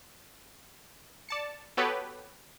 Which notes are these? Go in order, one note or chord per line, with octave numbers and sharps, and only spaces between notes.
D5 A5 C#7
B3 F#4 G4 A4 B4 C#5